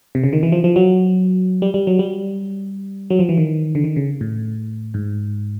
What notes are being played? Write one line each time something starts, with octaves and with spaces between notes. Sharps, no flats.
C3
C#3
D#3
E3
F3
F3
F#3
G3
G3
F#3
G3
F#3
F3
E3
D#3
D3
D#3
C#3
A2
G#2